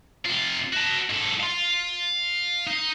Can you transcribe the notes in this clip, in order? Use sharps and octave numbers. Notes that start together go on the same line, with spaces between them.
C3 F4
F#4 A5
G#2 A4
F5 C6
D#4